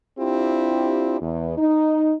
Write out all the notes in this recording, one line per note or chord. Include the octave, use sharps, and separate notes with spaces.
C4 D4 E4 F4 G4
E2
D#4